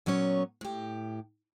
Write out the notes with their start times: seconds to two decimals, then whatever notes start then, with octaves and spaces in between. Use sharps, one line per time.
0.06 A#2 F#3 B3 C#4 C#5
0.61 A2 G4